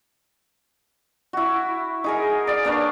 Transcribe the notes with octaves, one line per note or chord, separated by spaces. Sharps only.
E4 F#4
D#4 G#4 A#4
D5 F5
A#3 D4 B4 C#5